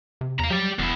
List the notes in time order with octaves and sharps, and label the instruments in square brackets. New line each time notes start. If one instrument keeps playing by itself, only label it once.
[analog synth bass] C3
[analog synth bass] E2 [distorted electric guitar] F5 A#5
[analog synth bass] F#3 [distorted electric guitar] G4 D5
[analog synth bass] E1 [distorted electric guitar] E2 E4